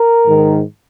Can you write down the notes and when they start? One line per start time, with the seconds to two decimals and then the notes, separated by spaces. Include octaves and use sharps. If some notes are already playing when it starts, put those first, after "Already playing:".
Already playing: A#4
0.25 G#2 D#3